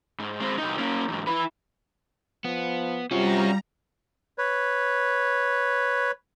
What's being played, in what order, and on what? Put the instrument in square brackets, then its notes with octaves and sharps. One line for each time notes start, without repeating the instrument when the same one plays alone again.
[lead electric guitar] G#2
G#3 C4
C2 D#4
A#3 C#4
E2 G#2
E4 B4
[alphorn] F3 [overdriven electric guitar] B3
[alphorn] C3 [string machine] G3 A#5 [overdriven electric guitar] C#4 F#4 [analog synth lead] F4
[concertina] B4 C#5